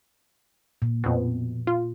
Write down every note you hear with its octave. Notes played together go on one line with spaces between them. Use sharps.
A#2
F2 B2
F4